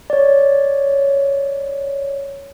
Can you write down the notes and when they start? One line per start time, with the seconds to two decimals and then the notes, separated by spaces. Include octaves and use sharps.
0.10 C#5 D5